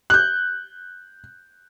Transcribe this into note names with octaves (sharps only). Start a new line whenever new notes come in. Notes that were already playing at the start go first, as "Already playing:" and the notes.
F#6 G6